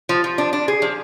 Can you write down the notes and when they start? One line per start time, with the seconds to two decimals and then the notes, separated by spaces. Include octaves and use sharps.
0.09 F3
0.24 F3
0.38 D4
0.53 D4
0.68 G#4
0.82 F3